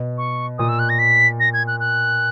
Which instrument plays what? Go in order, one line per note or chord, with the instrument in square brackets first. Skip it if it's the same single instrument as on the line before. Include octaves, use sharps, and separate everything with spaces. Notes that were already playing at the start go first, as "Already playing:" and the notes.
Already playing: [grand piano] B2
[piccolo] C#6
[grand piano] A#2 [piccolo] D#6
[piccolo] E6
F#6
A#6
B6
A#6
G#6
F#6
F#6